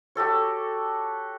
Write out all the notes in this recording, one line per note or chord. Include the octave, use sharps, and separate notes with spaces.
F#4 G4 A4 C#5